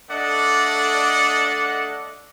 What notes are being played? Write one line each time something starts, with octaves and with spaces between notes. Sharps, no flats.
A3 D4 A4 D5 D#5 F#5